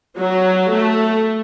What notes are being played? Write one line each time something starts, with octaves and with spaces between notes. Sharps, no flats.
F#3
A3